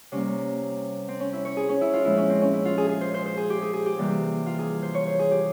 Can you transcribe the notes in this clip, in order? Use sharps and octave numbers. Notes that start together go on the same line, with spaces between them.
C3 G3 A#3 C#4
C4
C#4
E4
C#5
G#4
C#4
E4
F4
A#2 F3 G#3 E4
C#4
C4
C#4
E4
F4
G#4
G#4
C5
C5
C5
G#4
G4
G#4
G#4
G4
C3 E3 G3 A#3
F4
G#4
C5
C#5
C5
G#4
G4